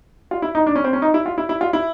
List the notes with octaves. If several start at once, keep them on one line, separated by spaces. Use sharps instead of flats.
F4
E4
D#4
D4
C#4
C4
C#4
D#4
E4
F4
E4
E4
F4
E4